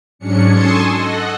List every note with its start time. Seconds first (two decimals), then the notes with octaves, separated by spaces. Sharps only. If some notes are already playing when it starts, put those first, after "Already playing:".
0.19 G#2 F#3 C#4 D4 C#7
0.49 A4 G#5 A5 C6 C#6 D#6
0.93 A4 D#5 F#5